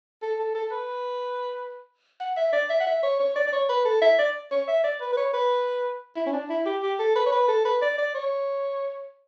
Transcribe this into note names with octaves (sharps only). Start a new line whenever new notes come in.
A4
A4
A4
B4
F#5
E5
D5
E5
F#5
E5
C#5
C#5
D5
D5
C#5
B4
A4
E5
D5
C#5
E5
D5
B4
B4
C#5
B4
E4
C#4
D4
E4
G4
G4
A4
B4
C#5
B4
A4
B4
D5
D5
C#5